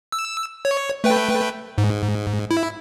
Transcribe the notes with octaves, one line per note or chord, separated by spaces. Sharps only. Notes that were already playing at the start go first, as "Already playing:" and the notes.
E6
C#5
A3 B4 G5
G#2
E4